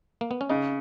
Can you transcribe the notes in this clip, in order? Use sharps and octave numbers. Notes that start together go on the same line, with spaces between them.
A#3
B3
C#4
C#3 D#4